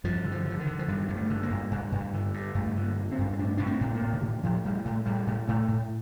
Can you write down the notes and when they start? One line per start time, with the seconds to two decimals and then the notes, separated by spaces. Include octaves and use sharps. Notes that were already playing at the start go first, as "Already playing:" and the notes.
0.04 G2 F3
0.25 D3
0.32 F3
0.45 D3 F3
0.59 D#3
0.66 D3
0.79 F3
0.88 G2 D#3
1.08 G2 G3
1.16 A3
1.30 D3
1.43 A#3
1.50 G2
1.71 G2
1.92 G2
2.14 D3
2.34 G2
2.55 G2 A3
2.76 D3
2.83 A#3
2.97 D3
3.12 C4
3.19 G2
3.32 C4
3.39 A2 D4
3.57 A2 D4
3.66 C4
3.81 A2
3.95 A#3
4.02 A2
4.13 D3
4.23 A2 D#3
4.43 A2 F3
4.65 A2 G3
4.85 A2 A3
5.06 A2 G3
5.27 A2
5.48 A2 A3
5.68 A2